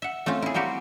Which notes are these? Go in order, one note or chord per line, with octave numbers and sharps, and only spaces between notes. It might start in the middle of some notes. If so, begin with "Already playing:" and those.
E5 F#5
A3 C4 C#4 F4
E4 G#4
G3 A#3 C4 F#4 G4